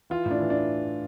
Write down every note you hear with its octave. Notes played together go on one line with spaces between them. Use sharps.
E3 F4
A2
D4
E3
D4